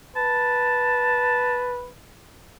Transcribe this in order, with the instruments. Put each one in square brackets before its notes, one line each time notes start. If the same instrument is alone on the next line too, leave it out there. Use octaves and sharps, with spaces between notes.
[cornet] B4 [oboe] A5